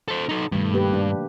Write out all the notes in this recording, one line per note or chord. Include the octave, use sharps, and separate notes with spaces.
A4 C5
D#4 A4
G2 B2 D#3 A3
A#3 G4 B4
D4